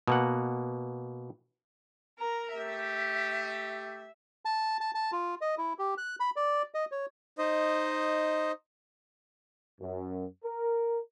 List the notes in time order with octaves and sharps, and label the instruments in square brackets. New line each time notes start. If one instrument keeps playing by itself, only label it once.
[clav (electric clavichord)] B2 A#3 F#5
[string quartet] A#4 A#5
[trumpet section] A3 G4 [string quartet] E5
[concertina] A5
A5
A5
F4
D#5
E4
G4
F#6
B5
D5
D#5
C#5
[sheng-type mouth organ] D#4 C5 D#5
[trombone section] F#2
A#4